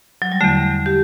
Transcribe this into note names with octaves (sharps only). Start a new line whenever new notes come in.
F#3
G3
E2 D3 A3
G4